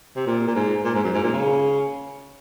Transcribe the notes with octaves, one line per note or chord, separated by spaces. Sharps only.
C3
A#2
A#2
G#2
A#2
G#2
F#2
G#2
A#2
C#3